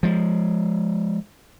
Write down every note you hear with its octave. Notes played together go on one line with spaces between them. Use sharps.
F3 G#3